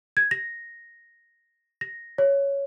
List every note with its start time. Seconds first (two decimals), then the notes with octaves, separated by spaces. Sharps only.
0.17 G#6
0.31 A#6
1.81 A#6
2.18 C#5